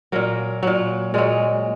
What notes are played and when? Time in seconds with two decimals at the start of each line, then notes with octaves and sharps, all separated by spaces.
0.12 A#2 F#3 A#3
0.63 A#2 F#3
1.14 A#2 F#3 G#3